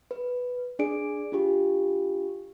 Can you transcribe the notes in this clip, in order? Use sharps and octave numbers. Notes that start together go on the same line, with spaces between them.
B4
D4 G#4 D5 D7
D4 F4 G4